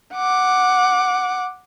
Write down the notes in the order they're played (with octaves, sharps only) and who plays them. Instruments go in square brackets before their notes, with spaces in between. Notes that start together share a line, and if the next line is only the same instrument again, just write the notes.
[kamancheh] F#5 D6